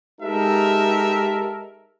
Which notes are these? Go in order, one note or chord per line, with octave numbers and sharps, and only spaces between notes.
G#3 D#4 G4 A4 A#4 E5